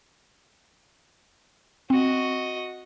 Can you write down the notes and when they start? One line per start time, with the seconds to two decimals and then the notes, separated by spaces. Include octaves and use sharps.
1.90 C4 F#4 D#5